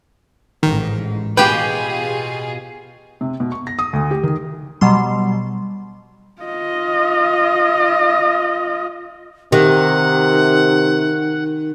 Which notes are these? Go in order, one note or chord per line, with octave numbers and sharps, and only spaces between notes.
A1 G#2 D#3
B2 F4 G4 G#4 B4 G5
C3
B2
C#6
A#6
D#6
D2
G4
D#3
B2 F#3 G3 C6
F4 D#5
C3 D#3 G4 F#5